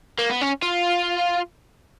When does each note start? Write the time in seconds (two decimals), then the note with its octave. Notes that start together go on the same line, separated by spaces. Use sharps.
0.19 A#3
0.30 B3
0.41 C#4
0.62 F4